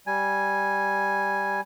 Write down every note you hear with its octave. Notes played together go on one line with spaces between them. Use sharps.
G3 G#5